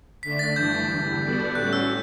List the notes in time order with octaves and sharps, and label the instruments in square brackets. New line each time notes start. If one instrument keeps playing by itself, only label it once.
[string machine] D3 A3 D4 [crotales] B6
[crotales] A6
[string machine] G2 E3 A3 D4 [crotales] G6
[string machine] E2 D3 G3
G3 B3 F#4 A4 D5
[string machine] A2 G3 C#4 F#4 [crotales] F#6
[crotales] E6